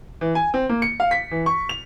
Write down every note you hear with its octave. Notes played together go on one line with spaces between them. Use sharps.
E3
G#5
C4
A#3
C#7
F5
B6
E3
C#6
F7